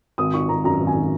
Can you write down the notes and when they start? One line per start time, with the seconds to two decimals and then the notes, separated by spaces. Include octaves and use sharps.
0.18 G#1 D#6
0.34 D#3 C#6
0.49 G#1 A#5
0.64 F#2 A#5
0.81 G#1
0.87 G#5
0.96 D#3